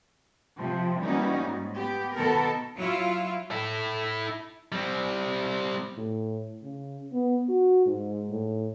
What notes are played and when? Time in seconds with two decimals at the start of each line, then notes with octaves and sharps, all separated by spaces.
0.60 C3 F3
1.01 E3 G3 A#3 C#4 D#4 F#4
1.38 G#2
1.77 B3 G4
2.16 B2 D#3 B3 A4 A#4
2.77 F#3 E4 F4
3.51 E4 A4
4.72 G3 C4
5.97 A2
6.63 C#3
7.13 B3
7.49 F#4
7.86 G#2
8.30 A2